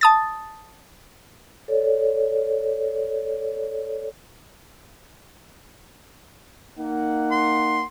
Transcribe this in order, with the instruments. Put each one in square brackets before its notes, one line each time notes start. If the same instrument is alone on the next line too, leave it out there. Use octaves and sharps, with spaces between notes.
[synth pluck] A5 D#6 A6
[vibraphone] A4 C#5 D5
[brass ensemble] A#3 D#4 F#5
[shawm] C6